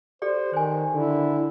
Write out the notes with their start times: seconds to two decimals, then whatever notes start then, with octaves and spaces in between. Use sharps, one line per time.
0.22 G4 A4 C5 D5
0.53 D#3 C5 G#5
0.94 D3 E4